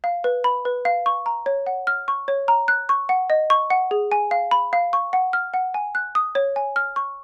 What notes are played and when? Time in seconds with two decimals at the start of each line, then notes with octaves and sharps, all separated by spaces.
0.04 F5
0.24 B4
0.44 B5
0.65 B4
0.85 F5
1.06 C#6
1.26 A#5
1.46 C#5
1.67 F#5
1.87 F6
2.08 C#6
2.28 C#5
2.48 A#5
2.68 F#6
2.89 C#6
3.09 F#5
3.30 D#5
3.50 C#6
3.70 F#5
3.91 G#4
4.12 G#5
4.31 F5
4.51 B5
4.73 F5
4.93 C#6
5.13 F#5
5.33 F6
5.54 F#5
5.74 G#5
5.95 F#6
6.15 D#6
6.35 C#5
6.56 G#5
6.76 F6
6.96 C#6